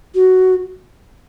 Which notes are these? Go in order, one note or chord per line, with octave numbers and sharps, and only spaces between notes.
F#4